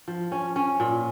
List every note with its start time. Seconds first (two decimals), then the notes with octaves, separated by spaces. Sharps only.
0.08 F3
0.32 C#4
0.56 C#4
0.80 A#2